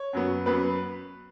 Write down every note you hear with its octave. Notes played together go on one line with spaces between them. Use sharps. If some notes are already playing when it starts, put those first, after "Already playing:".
Already playing: C#5
F#2 F#3 B3
F#2 F#3 B3 B4